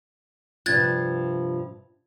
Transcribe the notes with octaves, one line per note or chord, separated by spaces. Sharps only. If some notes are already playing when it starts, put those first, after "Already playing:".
G2 C3 F3 F#6 G#6 A6